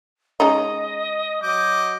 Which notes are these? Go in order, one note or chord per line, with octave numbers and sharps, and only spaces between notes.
G#3 C#4 D#4 D#5
F#3 D#5 D6 G6